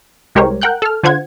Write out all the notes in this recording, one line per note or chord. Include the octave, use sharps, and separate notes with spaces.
C2 G#3 G4 A#4 C5 C#5
A#4 F#5 G5 F#6 G6
A4 F6
D3 F4 C5 F#5 G#6